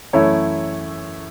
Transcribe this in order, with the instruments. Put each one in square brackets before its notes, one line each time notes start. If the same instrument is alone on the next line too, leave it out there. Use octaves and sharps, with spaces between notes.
[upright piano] F#2 E3 A3 E4 C#5